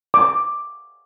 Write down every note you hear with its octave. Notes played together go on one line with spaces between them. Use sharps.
D6